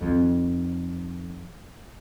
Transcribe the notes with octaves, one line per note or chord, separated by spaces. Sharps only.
F2 D#3